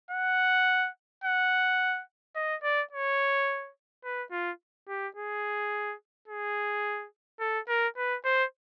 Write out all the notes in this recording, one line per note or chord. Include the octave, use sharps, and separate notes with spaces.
F#5
F#5
D#5
D5
C#5
B4
F4
G4
G#4
G#4
A4
A#4
B4
C5